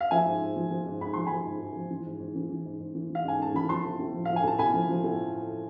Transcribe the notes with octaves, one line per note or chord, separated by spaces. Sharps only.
F5
F3 E5 G#5
G#2
G#2
F3
F3
G#2
G#2 B5
F3 C6
F3 G#5 B5
G#2
G#2
F3
E3
G#2
G#2
E3
E3
G#2
G#2
E3
E3
F5
G#2 G#5
G#2 A5
E3 B5
F3 A5 C6
A2
A2
F3
F3 F5
G#5
A2 A5
A2 G#5 B5
F3
F3
A2